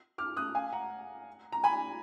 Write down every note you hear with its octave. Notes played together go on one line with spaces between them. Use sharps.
D6 F6
D#6 F#6
F5 G#5
F#5 A#5
A#5
G#5 B5